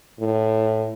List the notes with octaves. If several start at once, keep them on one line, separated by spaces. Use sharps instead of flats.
A2